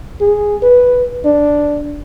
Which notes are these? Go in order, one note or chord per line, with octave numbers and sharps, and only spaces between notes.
G#4
B4
D4